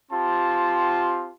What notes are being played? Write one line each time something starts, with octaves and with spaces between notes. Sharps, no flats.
C4 F4 G4 A5 C6